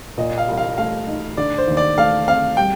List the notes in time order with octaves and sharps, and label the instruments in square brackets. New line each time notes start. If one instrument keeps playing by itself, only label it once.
[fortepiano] A#2 [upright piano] D#5
[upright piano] F5
[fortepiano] C2
[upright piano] F5
[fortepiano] A3 [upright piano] F5
[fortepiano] D#4
[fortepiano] D3 [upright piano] D5
[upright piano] C5
[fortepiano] D#2
[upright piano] D5
[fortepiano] A3 [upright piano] F5
[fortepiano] C4 [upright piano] F5
[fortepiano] G3 [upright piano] G5